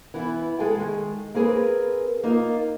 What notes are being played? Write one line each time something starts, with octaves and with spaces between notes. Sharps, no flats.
E3 B3 E4
G#3 G#4 A4 G5
D#3 G#3
A#3 C4 G#4 A#4 B4
A#3 D#4 F4